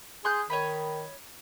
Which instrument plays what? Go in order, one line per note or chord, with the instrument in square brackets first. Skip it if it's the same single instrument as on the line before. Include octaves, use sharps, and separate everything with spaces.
[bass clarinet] G#4 [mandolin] C6 F#6 G6
[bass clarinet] D#3 [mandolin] C#5 D#5 B5